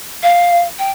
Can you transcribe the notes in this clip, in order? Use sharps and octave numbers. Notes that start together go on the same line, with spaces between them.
F5
G5